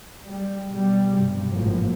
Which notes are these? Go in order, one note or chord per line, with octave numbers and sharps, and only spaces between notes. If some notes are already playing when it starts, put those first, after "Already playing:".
G3
B2 G3
B1 G2 C3
G#1 A2 F3 F#3 A#3